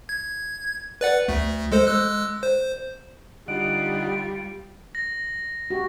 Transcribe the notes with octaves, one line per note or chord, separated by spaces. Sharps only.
G#6
B4 D5 F#5
D2 A3
G#3 A4 C5
G#3 E6 F#6
C5
D3 G3 D#4 F4 F#5 D7
A#6
F#4 G4